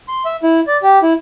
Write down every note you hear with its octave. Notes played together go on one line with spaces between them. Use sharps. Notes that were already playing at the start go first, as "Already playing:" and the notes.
C6
E5
E4
D5
G4
E4